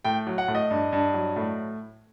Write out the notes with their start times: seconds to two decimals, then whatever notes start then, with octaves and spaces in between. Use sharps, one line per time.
0.04 A2 G5
0.27 F#3
0.38 F#5
0.48 A2
0.55 D#5
0.71 G2
0.93 G2
1.14 F#3
1.36 A2